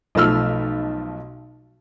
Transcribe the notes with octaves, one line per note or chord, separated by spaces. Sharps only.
B1 F3 A3 E6 F6